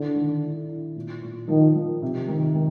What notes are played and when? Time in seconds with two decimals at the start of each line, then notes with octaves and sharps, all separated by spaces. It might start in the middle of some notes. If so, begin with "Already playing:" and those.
Already playing: D3 E4
0.16 D#3
0.42 E4
0.69 E4
0.96 A#2
1.23 A#2
1.48 D#3 F3
1.75 F3
2.02 C3
2.28 D#3
2.55 D#3